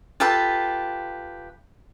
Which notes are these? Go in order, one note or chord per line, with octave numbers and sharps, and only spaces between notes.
F4 G4 A4 B4